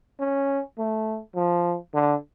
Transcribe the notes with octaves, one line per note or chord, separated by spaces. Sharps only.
C#4
A3
F3
D3